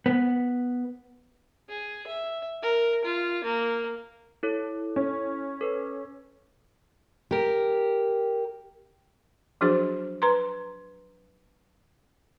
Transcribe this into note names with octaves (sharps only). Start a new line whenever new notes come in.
B3
G#4
E5
A#4
F4
A#3
E4 A4 C#5
C#4
A4 B4
G4 A#4
F3 F#3 D4 F#4 G#4 C5
B4 A#5 C6